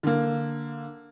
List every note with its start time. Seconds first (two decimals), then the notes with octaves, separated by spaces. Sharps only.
0.03 D3 A#3